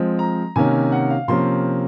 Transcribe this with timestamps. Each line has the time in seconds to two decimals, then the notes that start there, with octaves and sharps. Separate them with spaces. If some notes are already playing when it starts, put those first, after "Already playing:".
Already playing: F3 G#3 C4
0.19 A#5
0.56 C3 D#3 A#3 C#4 G#5
0.92 F#5
1.10 F5
1.28 C3 F3 A#3 C#4 C6